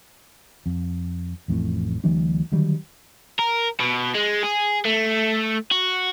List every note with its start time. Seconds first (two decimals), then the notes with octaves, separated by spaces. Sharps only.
0.66 F2
1.48 A1 F2 A2
2.04 D2 E3 F#3 D4
2.52 D3 D#3 F#3 G3
3.39 A#4
3.80 B2
4.14 G#3
4.43 G#4
4.85 A3
5.72 F#4